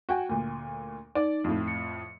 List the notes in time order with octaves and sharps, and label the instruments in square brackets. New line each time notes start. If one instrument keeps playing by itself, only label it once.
[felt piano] F#4 G5 G#5
D2 A#2
[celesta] D#4 [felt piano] D5
[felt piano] F2 A2
[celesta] C#7